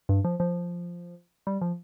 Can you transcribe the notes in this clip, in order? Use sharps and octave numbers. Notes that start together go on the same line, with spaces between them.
G2
F3
F3
G3
F3